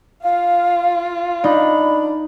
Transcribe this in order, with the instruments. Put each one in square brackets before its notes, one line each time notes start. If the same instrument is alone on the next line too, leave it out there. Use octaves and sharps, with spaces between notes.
[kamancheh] F4 [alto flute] F5
[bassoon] D4 [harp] D#4 [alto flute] B5